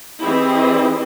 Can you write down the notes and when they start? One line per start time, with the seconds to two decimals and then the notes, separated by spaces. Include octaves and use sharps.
0.22 E3 C4 E4 G4 G#4 D#5